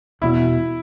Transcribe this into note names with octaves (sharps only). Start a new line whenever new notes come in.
E1 E2 B2 E4